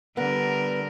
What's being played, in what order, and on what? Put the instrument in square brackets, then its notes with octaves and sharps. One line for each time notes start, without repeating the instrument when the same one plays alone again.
[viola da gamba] D3 G3 A#4 [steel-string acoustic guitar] B3